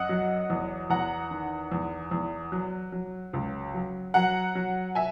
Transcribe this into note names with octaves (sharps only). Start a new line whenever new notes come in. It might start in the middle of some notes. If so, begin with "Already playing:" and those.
Already playing: F#2 D#5 F#5
F#3
E2
E2 F#5 A#5
D#3
E2
E2
F#3
F#3
C#2
F#3
F#3 F#5 A#5
F#3
E5 G#5